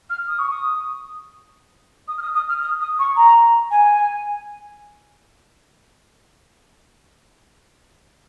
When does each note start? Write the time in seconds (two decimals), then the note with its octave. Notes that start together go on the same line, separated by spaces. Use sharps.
0.09 F6
0.28 D#6
0.39 C#6
0.50 D#6
2.08 D#6
2.17 F6
2.22 D#6
2.34 D#6
2.48 F6
2.61 D#6
2.81 D#6
2.99 C#6
3.16 A#5
3.71 G#5